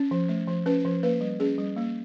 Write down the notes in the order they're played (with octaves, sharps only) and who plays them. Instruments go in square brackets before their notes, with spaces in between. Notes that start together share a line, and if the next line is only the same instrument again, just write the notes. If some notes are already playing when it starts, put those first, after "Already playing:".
Already playing: [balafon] C#4
F3
A3
F3
C#4 B4
F3
A#3 B4
G3
C#4 G#4
G3
A#3